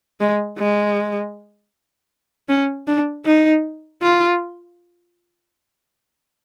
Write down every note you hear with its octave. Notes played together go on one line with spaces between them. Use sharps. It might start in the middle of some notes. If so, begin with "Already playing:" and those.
G#3
G#3
C#4
D4
D#4
F4